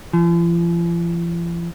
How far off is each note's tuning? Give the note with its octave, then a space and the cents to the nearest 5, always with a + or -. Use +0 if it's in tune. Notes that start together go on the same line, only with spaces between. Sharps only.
F3 -45